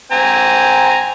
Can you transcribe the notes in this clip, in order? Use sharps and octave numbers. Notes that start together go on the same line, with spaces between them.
C4 G#5 A#5